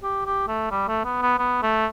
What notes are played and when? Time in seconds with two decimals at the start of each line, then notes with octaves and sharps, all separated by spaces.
0.03 G4
0.26 G4
0.48 A3
0.71 G3
0.88 A3
1.05 B3
1.22 B3
1.39 B3
1.63 A3